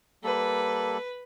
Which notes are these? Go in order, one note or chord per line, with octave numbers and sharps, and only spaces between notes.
G3 A#3 A4 B4